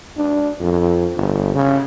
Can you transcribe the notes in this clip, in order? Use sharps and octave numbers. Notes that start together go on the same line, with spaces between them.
D4
F2
G1
C#3